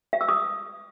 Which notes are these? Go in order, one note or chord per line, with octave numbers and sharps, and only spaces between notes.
E5
E6
D#6